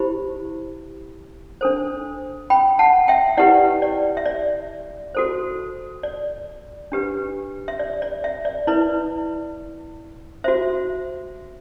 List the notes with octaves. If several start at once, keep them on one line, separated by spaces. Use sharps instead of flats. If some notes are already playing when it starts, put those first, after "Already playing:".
Already playing: E4 G4 C5 B5
D4 A4 C5
G5 B5
F#5 A5
E5 G5
E4 G4 B4 D5 F#5
D5
E5
D5
F#4 A4 C5
D5
D4 G4 B4
E5
D5
D5
E5
D5
E4 B4 D5
F#4 C5 E5